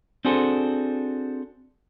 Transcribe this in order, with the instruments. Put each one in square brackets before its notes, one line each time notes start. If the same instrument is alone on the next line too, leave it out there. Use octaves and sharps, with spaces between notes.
[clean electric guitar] C4 D4 F#4 G#4 A4 C5